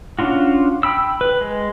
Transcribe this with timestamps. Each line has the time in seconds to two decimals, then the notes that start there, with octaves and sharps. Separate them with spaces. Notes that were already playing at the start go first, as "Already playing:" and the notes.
0.19 C#4 D4 F4 F#4
0.83 G5 B5 E6
1.21 B4
1.41 G#3